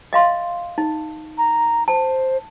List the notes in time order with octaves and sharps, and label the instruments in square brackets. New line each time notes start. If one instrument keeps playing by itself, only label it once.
[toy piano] D#5 F5 C6
D#4
[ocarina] A#5
[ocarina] C5 [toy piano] A5